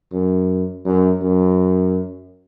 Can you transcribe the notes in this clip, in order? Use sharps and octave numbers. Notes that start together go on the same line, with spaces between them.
F#2
F#2
F#2